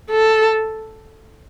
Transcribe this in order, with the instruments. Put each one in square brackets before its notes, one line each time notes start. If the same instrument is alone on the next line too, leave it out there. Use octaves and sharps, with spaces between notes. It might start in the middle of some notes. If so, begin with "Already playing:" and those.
[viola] A4